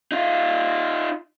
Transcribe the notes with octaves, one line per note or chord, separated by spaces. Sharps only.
D#4 F4